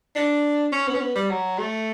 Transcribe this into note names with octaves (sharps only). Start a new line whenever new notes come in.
D4
C#4
B3
C#4
B3
G3
F#3
A3